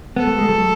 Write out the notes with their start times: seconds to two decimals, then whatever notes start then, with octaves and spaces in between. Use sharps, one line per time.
0.16 B3 A4
0.27 A3
0.38 G#3
0.48 F#3 A3